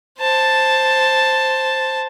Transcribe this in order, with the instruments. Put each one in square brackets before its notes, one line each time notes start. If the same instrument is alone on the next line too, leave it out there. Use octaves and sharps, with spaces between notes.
[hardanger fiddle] C5 A5